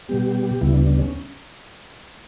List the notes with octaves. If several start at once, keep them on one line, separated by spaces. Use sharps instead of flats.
B2 G3 B3 G4
G4
G4
D2 C#3 G3 B3 E4
D4
D4
C#4